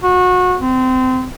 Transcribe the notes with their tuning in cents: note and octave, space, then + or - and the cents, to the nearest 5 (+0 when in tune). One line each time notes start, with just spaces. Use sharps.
F#4 -30
C4 -25